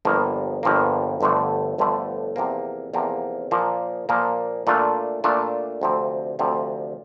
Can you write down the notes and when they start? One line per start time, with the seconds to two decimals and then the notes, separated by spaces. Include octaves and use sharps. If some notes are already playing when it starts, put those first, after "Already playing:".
0.05 G1 G2 F3 A#3
0.63 G1 G2 F3 A#3
1.21 G1 G2 D3 F3 A3
1.78 G1 G2 D3 F3 A3
2.36 E2 C3 F3 A#3
2.93 E2 C3 F3 A#3
3.51 A#2 F3 A#3
4.09 A#2 F3 A#3
4.67 A#2 A3 D4 F4
5.24 A#2 A3 D4 F4
5.81 D2 C3 F3 C4
6.39 D2 C3 F3 C4